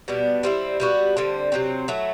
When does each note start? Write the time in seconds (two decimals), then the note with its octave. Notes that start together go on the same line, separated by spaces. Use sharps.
0.08 B2 G3 B3 D4
0.43 G3 C4 E4
0.80 G3 B3 D4 F#4
1.17 D3 G3 C4
1.52 C3 F#3 C4
1.88 F#3 A3 E4